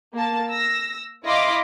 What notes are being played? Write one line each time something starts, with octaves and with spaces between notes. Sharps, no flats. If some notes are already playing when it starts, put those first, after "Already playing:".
A#3 A5
E6 A#6
E4 D#5 F5 B5 C6 D6